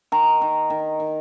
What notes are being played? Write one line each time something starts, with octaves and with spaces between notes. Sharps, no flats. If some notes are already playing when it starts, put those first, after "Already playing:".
D#3 A#5
D#3
D#3
D#3